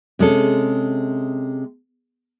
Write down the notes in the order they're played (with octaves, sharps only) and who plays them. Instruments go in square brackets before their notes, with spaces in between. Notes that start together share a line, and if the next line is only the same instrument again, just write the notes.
[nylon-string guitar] C3 G#3 C#4 A4